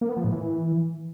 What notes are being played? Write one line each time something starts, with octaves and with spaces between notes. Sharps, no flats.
A#3
B3
F3
A2
E3